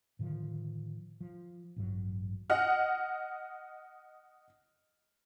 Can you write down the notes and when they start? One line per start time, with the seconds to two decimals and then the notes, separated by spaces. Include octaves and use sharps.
0.19 A2 D3 D#3 F3
1.21 F3
1.76 A1 G2 F#3
2.50 D#5 F#5 F6